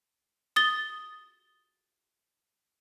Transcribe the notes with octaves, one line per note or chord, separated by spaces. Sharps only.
D#6 A6 G7